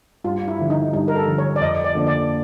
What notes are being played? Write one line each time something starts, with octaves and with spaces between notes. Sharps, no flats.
G2 F4
E4
D3 F3
D#4
G2 D#4
A#4
A4
D3 F3
C#5
D5
F2 D#5
D5
D3 F3 A#3 D4
D5